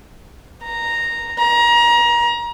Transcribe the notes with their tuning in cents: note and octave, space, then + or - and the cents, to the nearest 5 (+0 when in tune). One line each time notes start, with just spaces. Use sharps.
A#5 -5
A#5 +25